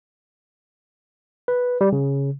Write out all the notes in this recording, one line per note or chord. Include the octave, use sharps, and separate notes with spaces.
B4
G3
C#3